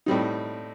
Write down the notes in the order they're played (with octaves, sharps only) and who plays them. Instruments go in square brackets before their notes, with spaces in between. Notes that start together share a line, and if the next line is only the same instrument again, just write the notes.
[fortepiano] A2 G3 C4 D#4